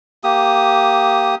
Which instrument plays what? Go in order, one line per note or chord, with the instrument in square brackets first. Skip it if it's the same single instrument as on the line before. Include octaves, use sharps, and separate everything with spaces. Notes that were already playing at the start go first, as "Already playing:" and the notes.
[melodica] A#3 G4 D#6